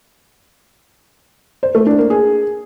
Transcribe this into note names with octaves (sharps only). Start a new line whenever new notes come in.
C5
A3
D4
A#3
G#4